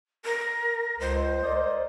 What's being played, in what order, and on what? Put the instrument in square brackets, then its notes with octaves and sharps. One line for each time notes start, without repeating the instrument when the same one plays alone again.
[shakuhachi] A#4
[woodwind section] C#2 [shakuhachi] C5
[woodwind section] A#4 D5 D#5